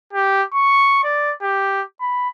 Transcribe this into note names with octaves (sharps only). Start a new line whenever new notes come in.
G4
C#6
D5
G4
B5